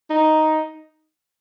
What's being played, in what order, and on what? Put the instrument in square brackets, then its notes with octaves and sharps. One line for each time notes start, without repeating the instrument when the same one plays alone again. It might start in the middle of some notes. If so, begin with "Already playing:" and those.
[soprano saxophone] D#4